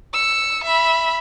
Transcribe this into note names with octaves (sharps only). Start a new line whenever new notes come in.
E6 C#7
E5 B5